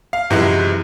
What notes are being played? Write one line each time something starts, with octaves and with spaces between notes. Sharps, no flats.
F5
F#2 C3 E3 F3 G#3 E4